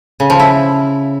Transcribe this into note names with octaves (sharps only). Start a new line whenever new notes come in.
C#3
F3
E4